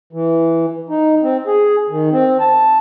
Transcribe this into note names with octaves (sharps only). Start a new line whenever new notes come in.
E3
D#4
C4
G#4
D#3
C4
A5